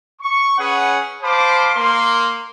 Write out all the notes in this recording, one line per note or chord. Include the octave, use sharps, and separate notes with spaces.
C#6
C#4 G#4 B4 C#5 F#5
C5 F5 A5 B5 C6 D6
A#3 C6